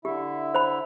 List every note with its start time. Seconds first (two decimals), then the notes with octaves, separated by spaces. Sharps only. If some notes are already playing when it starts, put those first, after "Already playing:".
0.05 D3 E4 G4 E5
0.55 C5 B5